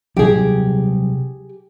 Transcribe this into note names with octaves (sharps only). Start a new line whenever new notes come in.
C3 F#3 G3 G4 G#4